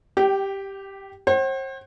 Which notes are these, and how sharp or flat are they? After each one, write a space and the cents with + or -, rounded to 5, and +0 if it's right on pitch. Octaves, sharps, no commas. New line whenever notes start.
G4 +0 G5 -25
C5 +40 F#5 +45